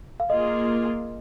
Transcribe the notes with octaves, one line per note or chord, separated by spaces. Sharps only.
F5
A#3 F4 G#4 D#5